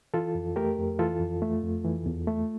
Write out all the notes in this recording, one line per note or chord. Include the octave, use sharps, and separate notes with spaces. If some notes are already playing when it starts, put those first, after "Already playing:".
E3 F4 A4
F2
A3 G4 A#4
F2
E3 F4 A4
F2
A3
F2
E3
E2
A3